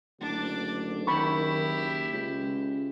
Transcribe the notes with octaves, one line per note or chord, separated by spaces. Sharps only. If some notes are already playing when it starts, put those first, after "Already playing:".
F#1 D2 D4 D6
D#3 E4 G4 B5 C#6
C#2 C#3